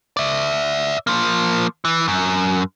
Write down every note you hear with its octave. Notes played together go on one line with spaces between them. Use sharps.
D5 E5
F3 A#3
E3
F#2